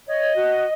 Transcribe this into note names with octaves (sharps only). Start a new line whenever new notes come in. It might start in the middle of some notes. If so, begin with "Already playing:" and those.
C#5 D#5
F#4